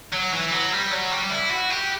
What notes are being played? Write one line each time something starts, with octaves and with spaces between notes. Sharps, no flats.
F#3
E3
F#3
G3
F#3
G3
E4
F#4
G4